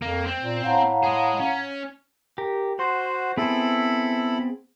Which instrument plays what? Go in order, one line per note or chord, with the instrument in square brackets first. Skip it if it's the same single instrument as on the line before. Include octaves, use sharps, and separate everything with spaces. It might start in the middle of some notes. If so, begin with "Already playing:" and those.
[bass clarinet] F2 [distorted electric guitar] A#3
[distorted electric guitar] C4
[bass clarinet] A#2
[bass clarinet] A2 [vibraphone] F5 F#5 A#5
[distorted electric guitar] G#4 D#5
C#4
[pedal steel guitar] G4 A#4
[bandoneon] F#4 C5 [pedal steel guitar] F#5 C6
[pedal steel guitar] B3 C4 G#4 [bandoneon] E4 A4 B5